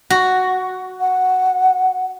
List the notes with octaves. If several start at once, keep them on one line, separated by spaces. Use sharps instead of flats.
F#4
F#5